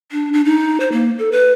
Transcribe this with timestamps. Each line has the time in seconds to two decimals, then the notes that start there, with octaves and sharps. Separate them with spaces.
0.12 D4
0.33 D4
0.45 D#4
0.80 C5
0.92 A#3
1.19 A4
1.32 B4